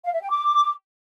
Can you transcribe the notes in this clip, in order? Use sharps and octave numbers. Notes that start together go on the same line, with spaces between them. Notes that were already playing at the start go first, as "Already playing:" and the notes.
F5
E5
G5
D6